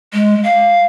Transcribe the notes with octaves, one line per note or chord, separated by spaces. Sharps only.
G#3
F5